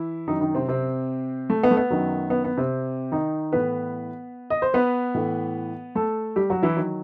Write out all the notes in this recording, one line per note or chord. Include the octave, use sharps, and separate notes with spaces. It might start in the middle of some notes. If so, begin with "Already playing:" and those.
Already playing: E3 E4
F#2 D#3 F#3 D#4
D#3 D#4
C3 C4
C3 C4
A3
B3
A3
B3
F#2 D#3 F#3
B3
B3
C3 C4
D#3 D#4
A2 E3 B3 B4
D#5
C5
B3 B4
A2 E3
A3 A4
G3 G4
F#3 F#4
E3 E4
D#3 F#3